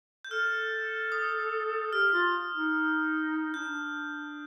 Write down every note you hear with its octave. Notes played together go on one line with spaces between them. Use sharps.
G6
A4 F6
D#6
G4 F6
F4
D#4
D4 G6